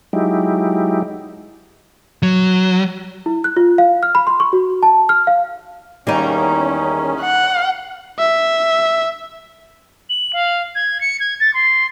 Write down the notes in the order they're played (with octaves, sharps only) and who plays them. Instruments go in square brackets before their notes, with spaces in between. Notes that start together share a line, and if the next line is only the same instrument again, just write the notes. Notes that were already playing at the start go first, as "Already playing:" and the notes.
[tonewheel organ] F#3 G#3 D#4 E4 G4
[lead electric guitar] F#3
[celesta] E4
F#6
F4
F5
F6
B5
C6
C#6
F#4
A5
F6
F5
[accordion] E2 C#4 [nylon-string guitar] D#3 G3 [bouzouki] A#3 D#4
[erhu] F#5
[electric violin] E5
[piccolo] F#7
F5
G#6
C#7
G#6
A6
C6